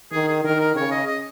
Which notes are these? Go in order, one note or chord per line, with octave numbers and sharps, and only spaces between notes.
D#3 G#4
G#4
D#3 A#4
A#4
C#3 C#5
D#5
D#5